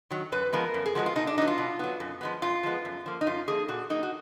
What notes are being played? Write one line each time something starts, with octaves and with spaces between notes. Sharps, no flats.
D#3 F#3
F#2 B4
F3 G#3 B3 A#4
F#2
G#4
F3 G#3 B3 F#4
F4
B2 D#4
D4
F#3 B3 D#4
F4
B2
F#3 B3
F#2
F3 G#3 B3
F#2 F4
F3 G#3 B3
F#2
F3 A#3
D#4
F#2 F4
F3 A#3 G#4
A#2 F#4
F#3 A#3 D#4
F#4